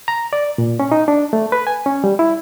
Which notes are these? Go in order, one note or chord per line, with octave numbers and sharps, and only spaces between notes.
A#5
D5
A#2
C#4
D#4
D4
A3
B4
G#5
C#4
G3
E4